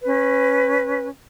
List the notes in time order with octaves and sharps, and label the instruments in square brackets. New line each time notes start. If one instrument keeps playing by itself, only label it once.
[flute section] C#4 B4